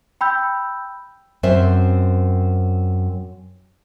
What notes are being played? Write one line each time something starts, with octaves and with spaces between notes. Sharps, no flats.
G5 B5 E6 G6
F#2 C4 C5 E5